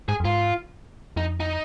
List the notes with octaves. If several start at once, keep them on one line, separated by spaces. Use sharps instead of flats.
G#2 G#4
F2
G#2 F4
F2 D#4
D#4